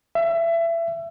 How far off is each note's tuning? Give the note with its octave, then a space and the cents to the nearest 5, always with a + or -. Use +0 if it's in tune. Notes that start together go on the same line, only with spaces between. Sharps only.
E5 +25